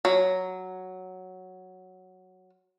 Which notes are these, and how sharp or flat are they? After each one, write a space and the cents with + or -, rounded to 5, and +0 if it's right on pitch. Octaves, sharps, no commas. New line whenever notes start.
F#3 +0